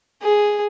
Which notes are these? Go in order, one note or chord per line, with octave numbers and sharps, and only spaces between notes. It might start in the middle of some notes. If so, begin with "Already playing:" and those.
G#4